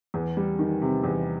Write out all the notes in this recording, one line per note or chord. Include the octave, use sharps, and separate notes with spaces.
E2
G3
D#3
C3
E2